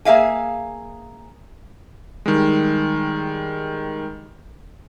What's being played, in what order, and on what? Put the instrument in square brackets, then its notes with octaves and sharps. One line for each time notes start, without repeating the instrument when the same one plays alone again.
[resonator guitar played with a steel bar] A#3 G#4 E5 F5 G#5
[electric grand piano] D#3 G3 G#3